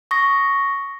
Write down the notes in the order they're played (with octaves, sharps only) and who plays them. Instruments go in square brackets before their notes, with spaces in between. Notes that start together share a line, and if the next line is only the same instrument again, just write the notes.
[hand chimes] C#6 D#6 A#6